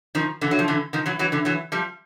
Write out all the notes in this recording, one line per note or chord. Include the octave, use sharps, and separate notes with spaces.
D#3 F3
D3 E3
F#3
F3
D3 E3
D#3 F3
E3 F#3
E3 F#3
D3 E3
E3 F#3
F3 G3